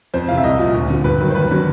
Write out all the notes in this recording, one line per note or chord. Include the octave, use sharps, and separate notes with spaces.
F2 C5
C3 E3 F5
E5
C2 D#5
A#2 F3
D2
D3 F3
G2 B4
D#3 F#3
C5
D#2 B4
D3 F#3